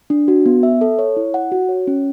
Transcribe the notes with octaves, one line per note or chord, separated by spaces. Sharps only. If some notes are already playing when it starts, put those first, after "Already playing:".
D4
F#4
B3
E5
A4
C#5
E4
F#5
F#4
C#5
C#4